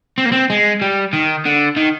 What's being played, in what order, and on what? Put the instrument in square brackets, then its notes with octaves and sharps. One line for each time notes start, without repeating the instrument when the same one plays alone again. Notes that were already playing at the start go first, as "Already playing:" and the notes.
[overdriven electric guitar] C4
A#3
C4
G#3
G3
D#3
D3
D#3